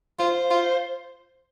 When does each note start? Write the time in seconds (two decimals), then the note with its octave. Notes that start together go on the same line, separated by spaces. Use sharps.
0.19 F4 C5
0.51 F4